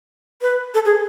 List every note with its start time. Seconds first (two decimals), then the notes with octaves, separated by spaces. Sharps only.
0.42 B4
0.74 A4
0.85 G#4